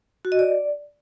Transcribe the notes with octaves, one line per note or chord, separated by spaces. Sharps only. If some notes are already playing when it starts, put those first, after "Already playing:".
F#4
D#5
D5